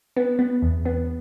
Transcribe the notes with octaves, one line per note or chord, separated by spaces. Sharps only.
B3
B3
E2
B3